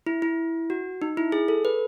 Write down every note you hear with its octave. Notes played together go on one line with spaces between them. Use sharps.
E4
E4
F#4
D#4
E4
G#4
A4
B4